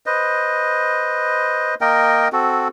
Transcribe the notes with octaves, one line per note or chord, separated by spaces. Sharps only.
B4 C5 D#5
A#3 A#4 D#5 G5
C4 F#4 A4